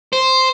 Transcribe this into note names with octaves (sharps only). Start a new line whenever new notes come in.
C5